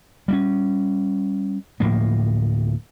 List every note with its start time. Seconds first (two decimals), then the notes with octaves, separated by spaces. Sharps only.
0.28 G3 A3 C#4
1.80 D1 A2 F3 A#3